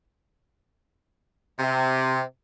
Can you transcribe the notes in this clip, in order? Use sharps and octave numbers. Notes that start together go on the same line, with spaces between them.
C3